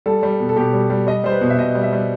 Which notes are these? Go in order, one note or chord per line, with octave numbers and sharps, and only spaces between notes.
G3 A4
G3
B2
A4
B2 G4
G3
G3
G3 D#5
G3 C5
B4
B2
E5
B2 D#5
G3
E5
G3